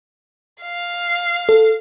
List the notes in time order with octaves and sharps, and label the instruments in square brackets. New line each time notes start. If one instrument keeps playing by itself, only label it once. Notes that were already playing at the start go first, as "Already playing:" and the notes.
[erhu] F5
[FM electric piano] A4